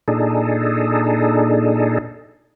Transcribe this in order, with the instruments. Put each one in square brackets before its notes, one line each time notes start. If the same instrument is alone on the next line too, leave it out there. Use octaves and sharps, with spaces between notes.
[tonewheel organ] A#2 D4 D#4 G#4 A4